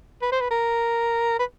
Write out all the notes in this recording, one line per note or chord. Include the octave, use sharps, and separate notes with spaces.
B4
C5
B4
A#4
B4